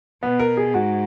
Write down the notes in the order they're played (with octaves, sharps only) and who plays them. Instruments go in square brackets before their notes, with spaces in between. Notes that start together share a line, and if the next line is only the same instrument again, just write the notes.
[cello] B2 [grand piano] B3
[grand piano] A#4
G#4
[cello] G#2 [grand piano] F#4